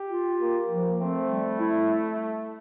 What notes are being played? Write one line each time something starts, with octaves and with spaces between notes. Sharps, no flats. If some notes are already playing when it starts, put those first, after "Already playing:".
Already playing: G4
F4
A#3
F3
A3 C4
G3
E4